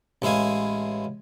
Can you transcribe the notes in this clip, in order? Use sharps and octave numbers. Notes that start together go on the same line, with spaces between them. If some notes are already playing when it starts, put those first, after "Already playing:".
A1 G#3 E4 F5 G#5